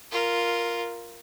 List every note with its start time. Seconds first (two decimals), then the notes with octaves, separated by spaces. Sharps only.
0.11 F4 A#4